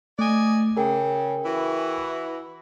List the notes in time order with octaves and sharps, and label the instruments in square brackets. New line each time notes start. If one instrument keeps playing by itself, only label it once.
[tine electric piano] A3 [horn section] D5 D#5 G#5
[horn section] C#3 [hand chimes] G#4 A#4 G5 [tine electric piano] G#5
[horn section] E3 E4 F#4